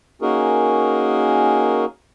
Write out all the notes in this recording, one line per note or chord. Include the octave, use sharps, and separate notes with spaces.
A#3 C#4 D#4 F#4 G#4 A#4